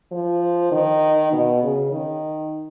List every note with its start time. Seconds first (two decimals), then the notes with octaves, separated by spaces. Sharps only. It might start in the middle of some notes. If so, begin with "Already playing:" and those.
0.12 F3
0.72 D#3
1.32 B2
1.63 C#3
1.92 D#3